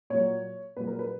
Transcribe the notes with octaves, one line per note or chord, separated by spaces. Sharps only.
A#2 F#3 C#5
A#2 F#3 B4
A#4
B4